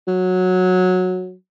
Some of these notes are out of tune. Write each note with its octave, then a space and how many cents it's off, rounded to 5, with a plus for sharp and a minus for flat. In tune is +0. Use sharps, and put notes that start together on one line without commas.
F#3 -10